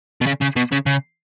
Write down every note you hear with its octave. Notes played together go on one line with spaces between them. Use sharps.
B2
C#3
C#3
B2
C#3
C#3